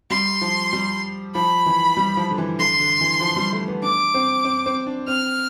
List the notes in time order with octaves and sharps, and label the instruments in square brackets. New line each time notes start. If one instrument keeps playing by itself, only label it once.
[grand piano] G3 [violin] C6
[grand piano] F3
G3
[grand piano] F3 [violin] B5
[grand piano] E3
G3
F3
D3
E3
[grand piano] D3 [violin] C6
[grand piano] D3
E3
F3
G3
A3
B3
[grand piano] D4 [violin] D6
[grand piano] C4
C4
C4
D4
[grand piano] C4 [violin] F6